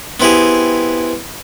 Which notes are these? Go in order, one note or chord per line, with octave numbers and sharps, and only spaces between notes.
B3 C4 E4 G4 G#4